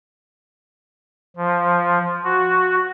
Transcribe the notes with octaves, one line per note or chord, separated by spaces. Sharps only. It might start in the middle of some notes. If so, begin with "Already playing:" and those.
F3
F#4